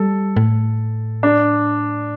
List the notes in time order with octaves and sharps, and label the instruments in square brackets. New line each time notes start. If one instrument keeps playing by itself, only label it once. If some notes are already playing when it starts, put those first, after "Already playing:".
Already playing: [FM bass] G3 [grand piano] A4
[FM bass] A2
[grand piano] D4